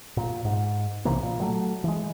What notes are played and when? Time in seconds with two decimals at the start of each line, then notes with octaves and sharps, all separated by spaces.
0.17 A#2
0.45 G#2
1.05 B1 C3 E3 A#3
1.23 A#2
1.41 F#3 A3
1.84 E3 G#3